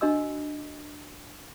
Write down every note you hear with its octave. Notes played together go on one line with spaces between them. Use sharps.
D4 F#4 D#5 C6 E6